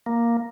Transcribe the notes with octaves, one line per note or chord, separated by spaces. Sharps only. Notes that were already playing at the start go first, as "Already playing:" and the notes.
A#3